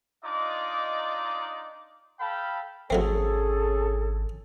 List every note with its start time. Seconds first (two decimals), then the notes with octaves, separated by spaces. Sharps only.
0.25 D4 D#4 F4 D5 D#5 D6
2.20 A4 F5 G5 A5 B5
2.90 G#1 F#3 A3 C4 C#4 G#4 A4